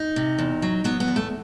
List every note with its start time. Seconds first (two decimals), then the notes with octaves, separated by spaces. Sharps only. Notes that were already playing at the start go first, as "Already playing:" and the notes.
Already playing: D#4
0.16 C3
0.39 E2
0.62 F#3
0.84 F#3 B3
1.00 B3
1.08 E2
1.16 A3